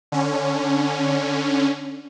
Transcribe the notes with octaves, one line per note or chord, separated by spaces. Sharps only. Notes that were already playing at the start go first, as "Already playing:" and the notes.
D3 C#4